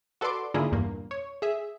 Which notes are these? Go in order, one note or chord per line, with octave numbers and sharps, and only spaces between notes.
F#4 A4 B4 D5 C6 D6
G#2 D3 A#3 E4 F4 G#4
E2 G2 A#2 A#3
C#5
G#4 E5